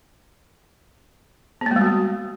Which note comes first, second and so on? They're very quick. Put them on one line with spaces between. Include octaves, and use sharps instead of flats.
B3 A#3 G#3 G3 F#4